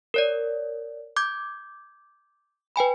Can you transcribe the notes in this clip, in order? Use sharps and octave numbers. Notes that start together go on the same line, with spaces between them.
A#4 C#5 D5
D6 G6 G#6
B4 G5 G#5 B5